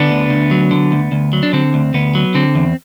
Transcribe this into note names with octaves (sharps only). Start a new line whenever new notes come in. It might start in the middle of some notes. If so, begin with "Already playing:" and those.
Already playing: D3 B3 D4
D2
D2
F#3
D3
D2
D2
F#3
D4
D3 C4
D2
D2 B3
F#3
D3 C4
E2